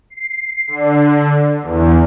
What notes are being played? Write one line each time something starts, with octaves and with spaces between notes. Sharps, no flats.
C7
D3
E2